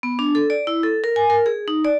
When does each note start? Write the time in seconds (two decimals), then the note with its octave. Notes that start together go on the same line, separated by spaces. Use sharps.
0.03 B3
0.19 D4
0.35 A4
0.50 D5
0.67 E4
0.83 A4
1.04 A#4
1.16 G#5
1.30 A#4
1.46 G#4
1.68 D#4
1.85 D5